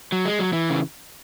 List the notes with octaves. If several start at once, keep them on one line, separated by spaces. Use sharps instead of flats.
F#3
G#3
F#3
E3
C#3